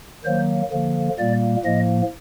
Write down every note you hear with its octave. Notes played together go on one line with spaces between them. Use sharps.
D#3 F#3 A#3 C5
D3 F3 A#3
A#2 G3 A#3 D5
A2 F3 A#3 D#5